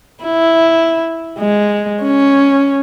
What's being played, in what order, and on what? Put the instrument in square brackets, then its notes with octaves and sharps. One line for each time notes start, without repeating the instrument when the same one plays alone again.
[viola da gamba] E4
G#3
C#4